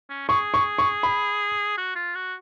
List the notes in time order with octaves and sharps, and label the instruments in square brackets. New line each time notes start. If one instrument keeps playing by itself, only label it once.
[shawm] C#4
[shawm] G#4 [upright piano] C#6
[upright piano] C#6
C#6
B5
[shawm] F#4
F4
F#4